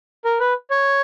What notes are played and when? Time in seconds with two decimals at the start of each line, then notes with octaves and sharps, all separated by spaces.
0.25 A#4
0.40 B4
0.70 C#5